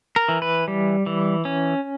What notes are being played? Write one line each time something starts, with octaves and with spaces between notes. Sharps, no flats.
A#4
E3
B4
G3
E3
C#4